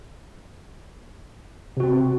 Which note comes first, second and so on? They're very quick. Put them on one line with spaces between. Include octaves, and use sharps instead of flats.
C3 F#4 C4